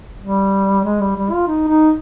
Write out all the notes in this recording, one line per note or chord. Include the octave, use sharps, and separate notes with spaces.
G3
G#3
G3
G3
F4
D#4
D#4